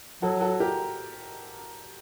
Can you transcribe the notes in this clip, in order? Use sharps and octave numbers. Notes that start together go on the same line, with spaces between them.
F#3 F#4 A4
F#4 A4
G4 A#4